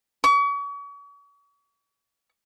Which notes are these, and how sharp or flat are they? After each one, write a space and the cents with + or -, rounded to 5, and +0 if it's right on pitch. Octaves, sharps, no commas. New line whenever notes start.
C#6 +40